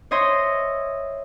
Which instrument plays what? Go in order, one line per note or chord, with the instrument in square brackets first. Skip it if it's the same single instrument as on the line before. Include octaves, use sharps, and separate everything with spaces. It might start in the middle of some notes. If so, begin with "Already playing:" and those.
[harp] C5 C#5 D#5 E5 C6